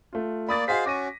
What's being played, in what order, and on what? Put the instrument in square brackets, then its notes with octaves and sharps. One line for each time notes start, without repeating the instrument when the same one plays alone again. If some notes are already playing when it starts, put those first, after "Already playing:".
[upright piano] A3 F4
[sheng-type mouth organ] A#3 D5 [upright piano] B5 D#6 A6
[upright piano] F#4 D#5 B6 [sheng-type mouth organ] G#4 C5 F5
[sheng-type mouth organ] C#4 F#4 [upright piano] D6 A#6 D#7